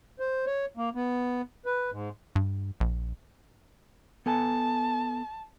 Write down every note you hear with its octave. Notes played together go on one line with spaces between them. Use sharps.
C5
C#5
A#3
B3
B4
G#2
G2
A#1
B3 A4 G#5 A5